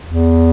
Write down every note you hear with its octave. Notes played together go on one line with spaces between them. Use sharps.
E2